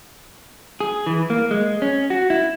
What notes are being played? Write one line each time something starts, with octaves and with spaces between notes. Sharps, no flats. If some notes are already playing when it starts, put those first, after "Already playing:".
G#4
E3
A#3
G#3
C#4
F#4
E4